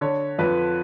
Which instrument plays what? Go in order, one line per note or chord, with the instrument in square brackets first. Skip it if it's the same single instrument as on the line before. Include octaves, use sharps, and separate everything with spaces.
[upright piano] D3 C#5
F2 B4